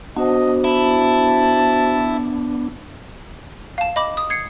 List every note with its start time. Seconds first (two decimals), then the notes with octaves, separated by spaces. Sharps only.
0.17 B3 D4 F#4 C5 D#5
0.64 E4 A5
3.78 F5 A5
3.96 D#5 B5 D6
4.17 D#6
4.30 G#6 C7 C#7